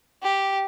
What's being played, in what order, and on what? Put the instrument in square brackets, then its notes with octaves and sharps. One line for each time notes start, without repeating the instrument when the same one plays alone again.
[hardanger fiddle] G4